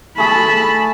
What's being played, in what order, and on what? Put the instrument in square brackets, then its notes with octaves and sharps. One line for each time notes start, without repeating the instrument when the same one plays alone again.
[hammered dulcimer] A3 G#4 [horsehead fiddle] A5 B5